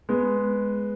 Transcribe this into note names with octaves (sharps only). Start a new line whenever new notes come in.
G#3 B3